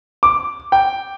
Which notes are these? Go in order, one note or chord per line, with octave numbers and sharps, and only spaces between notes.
D6
G5